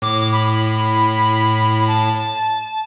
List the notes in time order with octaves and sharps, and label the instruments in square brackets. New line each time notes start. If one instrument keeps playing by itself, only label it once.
[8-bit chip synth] A2 [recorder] D6
[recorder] B5
A5